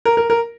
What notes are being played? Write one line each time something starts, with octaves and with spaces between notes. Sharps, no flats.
A#4
A#4
A#4